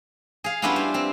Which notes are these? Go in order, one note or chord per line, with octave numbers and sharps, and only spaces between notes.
G#4 F5
G3 B3 C#4 D4 E4 F4
C5
C4